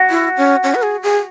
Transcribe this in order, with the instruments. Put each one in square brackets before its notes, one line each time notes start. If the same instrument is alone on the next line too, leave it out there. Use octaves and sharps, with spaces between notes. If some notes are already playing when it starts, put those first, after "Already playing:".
Already playing: [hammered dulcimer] F#4
[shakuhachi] E4
C#4
C#4
B4
G#4
G#4